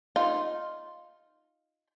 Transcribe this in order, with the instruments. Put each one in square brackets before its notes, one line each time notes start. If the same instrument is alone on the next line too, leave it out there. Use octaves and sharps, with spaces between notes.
[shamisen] D#4 F4